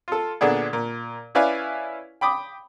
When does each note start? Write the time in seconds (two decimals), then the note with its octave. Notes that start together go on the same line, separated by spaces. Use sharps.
0.08 F4 A4
0.41 A#2 D3 B3 D4 G#4
0.73 A#2
1.35 C#4 E4 B4 D5 F5 G#5
2.21 G5 B5 D6 D#6